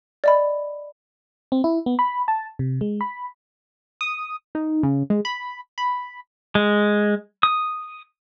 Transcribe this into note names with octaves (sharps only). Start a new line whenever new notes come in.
D5 D#5 B5
C4
E4
B3
B5
A5
C3
G#3
B5
D#6
D#4
C#3
G#3
B5
B5
G#3
D#6